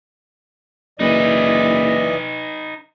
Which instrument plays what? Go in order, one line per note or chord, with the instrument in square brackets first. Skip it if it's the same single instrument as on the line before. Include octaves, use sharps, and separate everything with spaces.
[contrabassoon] F#1 [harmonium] E3 D5 D#5 [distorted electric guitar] D#4 B4